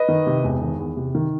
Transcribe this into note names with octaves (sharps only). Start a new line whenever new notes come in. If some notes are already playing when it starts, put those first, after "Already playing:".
Already playing: B4 D#5
D#3
C3
E1
D#3
E2
C3
D#3